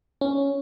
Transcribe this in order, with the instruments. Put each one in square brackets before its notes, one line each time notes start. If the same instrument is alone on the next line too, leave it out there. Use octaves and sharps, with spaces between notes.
[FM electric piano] C#4